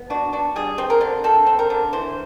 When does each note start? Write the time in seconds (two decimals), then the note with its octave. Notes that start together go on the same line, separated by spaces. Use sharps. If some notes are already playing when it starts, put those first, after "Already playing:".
Already playing: B3
0.10 D4 F#4
0.33 D4 F#4
0.56 G3 G#4
0.78 C4
0.90 A#4
1.01 D3
1.24 C4 A4
1.46 C4
1.59 A#4
1.70 D3
1.93 E3 C5